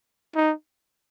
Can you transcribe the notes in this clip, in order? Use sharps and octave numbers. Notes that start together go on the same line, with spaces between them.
D#4